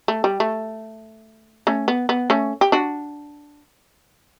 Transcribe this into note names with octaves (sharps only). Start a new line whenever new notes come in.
A3
G3
A3
A3 C#4
B3
B3
A3 C#4
G4
D4 F#4